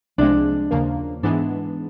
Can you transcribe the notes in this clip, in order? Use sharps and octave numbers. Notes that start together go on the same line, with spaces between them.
C2 C3 F3 G#3 D4
D#2 C#3 F3 A#3
G#2 E3 G#3 B3 D4